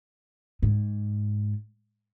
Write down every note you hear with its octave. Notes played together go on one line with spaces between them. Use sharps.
G#2